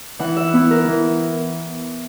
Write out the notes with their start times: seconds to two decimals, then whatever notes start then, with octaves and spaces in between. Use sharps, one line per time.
0.19 E3 F#5
0.36 E5
0.53 B3 E4
0.71 A#4
0.88 E3